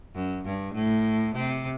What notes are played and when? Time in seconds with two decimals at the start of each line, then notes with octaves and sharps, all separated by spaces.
0.15 F#2
0.45 G2
0.75 A2
1.35 C3